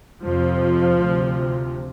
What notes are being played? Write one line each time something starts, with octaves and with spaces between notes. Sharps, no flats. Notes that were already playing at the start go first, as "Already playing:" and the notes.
F2 C3 F3
D2 C3